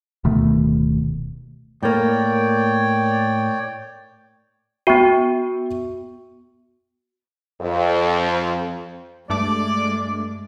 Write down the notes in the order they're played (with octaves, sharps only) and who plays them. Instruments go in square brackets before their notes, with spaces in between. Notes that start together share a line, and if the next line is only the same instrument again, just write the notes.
[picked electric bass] D1 B2 D#3 A3
[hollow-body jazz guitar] A2 A#3 [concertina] C#5 D5 G5
[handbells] B3 F#4 [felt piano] E5 G5 C#6
[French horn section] F2
[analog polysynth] G2 A3 D6 [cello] G#3 [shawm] D5